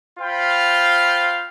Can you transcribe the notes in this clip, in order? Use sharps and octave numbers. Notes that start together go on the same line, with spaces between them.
F4 C5 F5 G5 B5